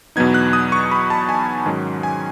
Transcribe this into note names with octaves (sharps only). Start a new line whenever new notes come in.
E2 B2 F#3 B3 D#4 G#6
F#6
D#6
C#6
B5
A5
G#5
G#2 D#3 F#3 C#4
G#5